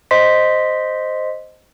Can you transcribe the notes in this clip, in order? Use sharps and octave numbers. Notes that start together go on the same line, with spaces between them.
C5 D#5 C6 B6